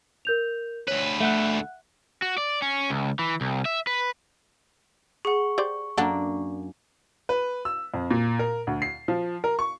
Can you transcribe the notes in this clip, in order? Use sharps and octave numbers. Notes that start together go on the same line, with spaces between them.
A#4 G6 F7
D2 B4 C#5
A3 E5 F#5 F#6
F#4
D5
C#4
C#2
E3
C2
E5
B4
G#4 F#5 C#6
G4 C5 D5
F#2 A#3 D4 A4 F#5 G7
B4
E6
F2
A#2
A#4
D2
C7
F3
A#4
C#6